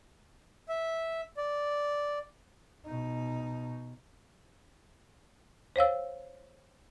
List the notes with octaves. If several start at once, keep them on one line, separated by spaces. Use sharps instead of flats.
E5
D5
B2 D#4
C5 C#5 F5 E6